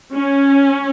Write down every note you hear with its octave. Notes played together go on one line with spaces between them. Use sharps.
C#4